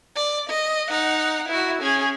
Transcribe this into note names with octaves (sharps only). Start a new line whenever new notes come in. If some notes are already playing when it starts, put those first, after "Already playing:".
D5
D#5
D#4 F#5
E4 F#4
C#4 G#4